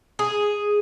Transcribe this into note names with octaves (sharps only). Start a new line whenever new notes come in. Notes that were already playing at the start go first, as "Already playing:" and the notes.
G#4